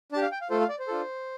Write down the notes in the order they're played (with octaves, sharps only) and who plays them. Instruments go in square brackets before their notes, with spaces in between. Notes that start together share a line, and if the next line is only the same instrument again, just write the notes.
[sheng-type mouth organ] D4 A5
G4
F5
G5
F5
A3 F4 A4 C5
F5
D5
C5
D4 F4 A4